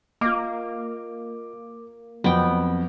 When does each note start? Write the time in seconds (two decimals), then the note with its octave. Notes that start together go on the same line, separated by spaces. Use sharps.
0.21 A#3 F4 D#5 D6
2.24 F2 F#3 B3 C4 G5